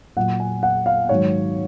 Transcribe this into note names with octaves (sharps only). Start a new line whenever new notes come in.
A#2 F#3 F#5
G#5
F#5
F5
G#2 D#3 F#3 C#5